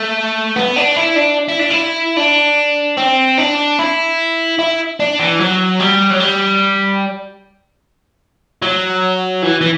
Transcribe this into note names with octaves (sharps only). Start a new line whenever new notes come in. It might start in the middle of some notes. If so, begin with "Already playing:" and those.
Already playing: A3
B3
D4
E4
D4
E4
D4
E4
D4
C4
D4
E4
E4
D4
E3
F#3
G3
F#3
G3
F#3
E3
E3